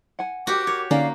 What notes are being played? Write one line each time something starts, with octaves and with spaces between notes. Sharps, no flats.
F#5 G#5
F#4 G4 A#4 C5 G5 D6
A#4 C#5
D3 A#3 C#4 D#4 D5 F5